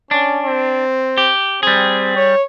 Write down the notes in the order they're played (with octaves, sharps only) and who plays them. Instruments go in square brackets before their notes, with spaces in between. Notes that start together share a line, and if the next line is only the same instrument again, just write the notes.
[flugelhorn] C#4 [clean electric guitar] D4
[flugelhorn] C4
[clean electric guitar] G4
[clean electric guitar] G3 G#4 [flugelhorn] C4
[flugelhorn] C#5